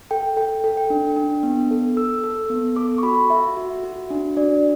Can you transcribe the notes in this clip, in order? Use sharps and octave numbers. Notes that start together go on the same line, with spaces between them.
A4 G5
A4 G5
A4
G5
D4
D4
B3
A4
A4 E6
A4
B3
A4 D6
C#6
F#4 B5
F#4 E5
F#4
F#4
D4
D4 D5